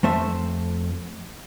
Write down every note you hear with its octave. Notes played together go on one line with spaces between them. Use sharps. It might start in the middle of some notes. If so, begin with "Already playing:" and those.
F2 A3 C5 E5